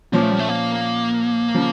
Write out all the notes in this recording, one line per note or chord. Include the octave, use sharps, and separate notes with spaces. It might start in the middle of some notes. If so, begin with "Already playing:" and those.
A#2 F3 A#3 C#4
A3
G3
A3
A#3
C#3 F3